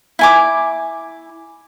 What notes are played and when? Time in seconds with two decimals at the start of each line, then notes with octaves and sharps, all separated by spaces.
0.19 E4 G#5 D6